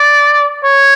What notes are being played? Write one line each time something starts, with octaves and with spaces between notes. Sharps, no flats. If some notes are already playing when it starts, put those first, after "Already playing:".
Already playing: D5
C#5